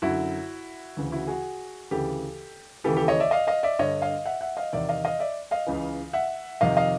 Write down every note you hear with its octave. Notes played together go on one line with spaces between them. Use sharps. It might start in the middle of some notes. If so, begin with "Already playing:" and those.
F#2 D3 E4 F#4
D2 C#3 E3
E4 F#4
F#4 G#4
D2 C#3 E3 G4 A4
D#2 C#3 E3 G4 A4
G4 A4
C#5 D#5
D5 E5
D#5 F5
D#5 F5
D5 E5
G2 D3 C#5 D#5
D#5 F5
E5 F#5
E5 F#5
D#5 F5
E2 C3 D#3 D5 E5
D#5 F5
D#5 F5
D5 E5
D#5 F5
C#2 C#3 E3
E5 F#5
F2 C3 D#3 D#5 F5
D#5 F5